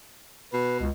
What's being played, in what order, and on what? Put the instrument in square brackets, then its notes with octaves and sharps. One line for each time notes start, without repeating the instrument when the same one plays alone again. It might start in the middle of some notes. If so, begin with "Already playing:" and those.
[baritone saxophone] B2 [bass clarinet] B4
[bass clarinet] C#2